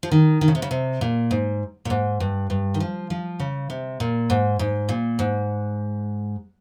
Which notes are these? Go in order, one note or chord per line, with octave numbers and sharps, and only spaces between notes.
F3
D#3
D#3
C#3
C3
C#3
C3
A#2
G#2
A#2
G#2
G2
G2
D#3
F3
F3
C#3
C3
A#2
G#2
G#2
A#2
G#2